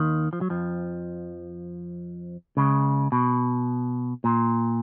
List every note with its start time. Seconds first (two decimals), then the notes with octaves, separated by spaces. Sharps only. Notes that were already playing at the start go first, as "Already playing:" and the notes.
Already playing: D#2 D#3
0.33 F3
0.41 F#3
0.50 F2 F3
2.57 C#2 C#3
3.12 B2
4.24 A#2